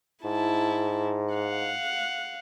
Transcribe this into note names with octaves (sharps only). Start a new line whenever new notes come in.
G#2 E4 A5
F5 F#5